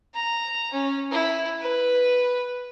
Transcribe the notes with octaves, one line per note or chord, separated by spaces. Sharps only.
A#5
C#4
E4
B4